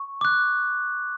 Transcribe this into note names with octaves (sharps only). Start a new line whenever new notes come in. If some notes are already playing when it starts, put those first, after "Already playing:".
Already playing: C#6
D6 F#6